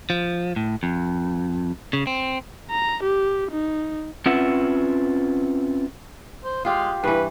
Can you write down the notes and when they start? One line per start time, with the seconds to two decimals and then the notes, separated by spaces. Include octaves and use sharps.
0.10 F3
0.56 A2
0.83 F2
1.93 C#3
2.07 C4
2.70 A#5
3.03 G4
3.51 D#4
4.26 C4 C#4 F4 B4 E5 F#5
6.44 C5
6.65 G#3 F4 G4 F5
7.04 G2 E3 B4